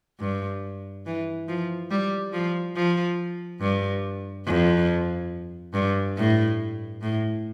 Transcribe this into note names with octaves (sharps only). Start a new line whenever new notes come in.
G2
E3
F3
G3
F3
F3
G2
F2
G2
A2
A2